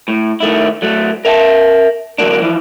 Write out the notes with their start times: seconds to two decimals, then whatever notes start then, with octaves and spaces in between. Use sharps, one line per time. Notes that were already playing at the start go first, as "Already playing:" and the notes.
0.08 A2
0.40 D#3 A3 E4
0.82 F#3 A3
1.25 A#4 E5 F5 A5
2.18 D3 F#3 A#3 D4
2.41 E3 F3